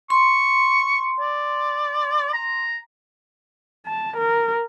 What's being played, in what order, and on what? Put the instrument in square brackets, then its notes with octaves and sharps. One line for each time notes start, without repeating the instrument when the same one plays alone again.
[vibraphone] C6 [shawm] C#6
[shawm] D5
A#5
[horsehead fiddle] A5
A#4